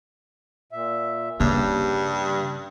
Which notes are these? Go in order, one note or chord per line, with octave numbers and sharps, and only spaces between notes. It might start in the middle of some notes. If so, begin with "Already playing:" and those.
A#2 E5
G2 C#3 G3 A#3